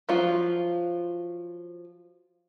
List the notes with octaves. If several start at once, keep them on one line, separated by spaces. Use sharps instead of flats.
F3 F#3 F4